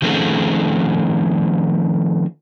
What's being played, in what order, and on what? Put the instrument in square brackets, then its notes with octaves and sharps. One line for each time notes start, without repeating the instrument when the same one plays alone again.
[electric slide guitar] D#3 F3 A3 C4 C#4 G#4